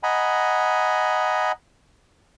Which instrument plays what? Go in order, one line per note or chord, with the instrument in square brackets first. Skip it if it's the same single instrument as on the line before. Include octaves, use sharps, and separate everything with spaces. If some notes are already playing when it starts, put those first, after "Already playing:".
[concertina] D#5 F#5 G#5 A#5 B5